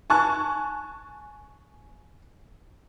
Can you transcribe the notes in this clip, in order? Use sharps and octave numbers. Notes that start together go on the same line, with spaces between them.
G#5 A5 C#6 F#6